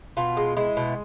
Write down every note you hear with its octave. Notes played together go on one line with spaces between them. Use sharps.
B2 F4
G#3
G#3 E4
B2